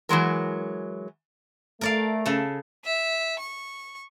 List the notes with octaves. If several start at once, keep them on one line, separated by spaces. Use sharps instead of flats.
E3 F#3 G#3 A#4
A3 A#4 D5 F5
C#3 A4
E5
C#6